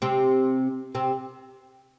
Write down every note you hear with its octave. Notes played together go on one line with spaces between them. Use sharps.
C3 C4
C3 C4